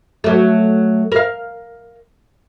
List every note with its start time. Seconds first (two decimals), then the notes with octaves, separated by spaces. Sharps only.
0.24 F#3 A3
1.12 A#4 F5